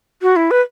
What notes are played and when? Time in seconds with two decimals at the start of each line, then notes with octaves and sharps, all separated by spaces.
0.22 F#4
0.36 E4
0.51 B4